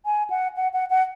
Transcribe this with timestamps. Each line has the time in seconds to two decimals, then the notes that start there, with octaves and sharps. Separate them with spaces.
0.06 G#5
0.30 F#5
0.56 F#5
0.73 F#5
0.90 F#5